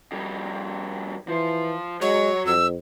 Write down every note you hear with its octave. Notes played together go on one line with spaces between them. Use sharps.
F2 G3
E3 F3 C5
F#3 G#3 C#5
F2 E6